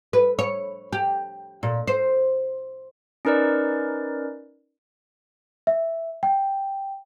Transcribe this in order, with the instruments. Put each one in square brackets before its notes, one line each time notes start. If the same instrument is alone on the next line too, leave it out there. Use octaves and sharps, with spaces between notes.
[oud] B4
C#5
G4
A#2
C5
[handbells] C#4 D#4 A#4 B4 D5
[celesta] E5
G5